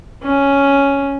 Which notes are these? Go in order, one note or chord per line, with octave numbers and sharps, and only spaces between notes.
C#4